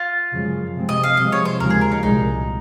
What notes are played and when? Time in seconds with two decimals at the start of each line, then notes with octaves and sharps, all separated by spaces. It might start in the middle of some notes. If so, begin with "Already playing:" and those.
Already playing: F4
0.32 F#2 C#3 F3 G#3
0.75 C3 F3 G#3 C4
0.89 D#5
1.03 F5
1.17 C3 F3 G#3 D#5
1.32 C#5
1.45 C5
1.60 D#2 C#3 F3 G#3 A#4
1.70 G#4
1.81 A#4
1.92 D#4
2.03 C2 A#2 G#3 D#4